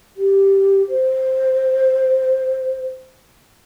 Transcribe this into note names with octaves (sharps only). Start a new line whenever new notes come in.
G4
C5